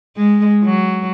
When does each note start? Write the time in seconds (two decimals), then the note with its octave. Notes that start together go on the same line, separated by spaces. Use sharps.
0.17 G#3
0.63 F#3